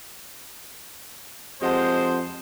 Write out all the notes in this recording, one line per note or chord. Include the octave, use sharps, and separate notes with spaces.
F2 G#3 G4 C5 F#5 A5